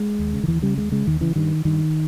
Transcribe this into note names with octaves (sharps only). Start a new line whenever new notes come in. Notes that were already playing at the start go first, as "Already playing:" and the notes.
Already playing: G#3
D#2
C#3
D#3
D#2 E3
C#3 G3
D#2 G#3
C#3 G#3
D#2 D#3
C#3 E3
G2 D#3
G2 D#3